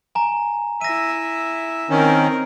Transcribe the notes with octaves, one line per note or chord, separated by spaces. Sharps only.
G#5 A#5
E4 E5 A#6 D#7
D#3 C4 C#4 A#4